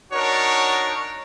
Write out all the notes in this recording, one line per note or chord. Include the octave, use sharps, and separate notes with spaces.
D4 D#4 F#4 A#4 C#5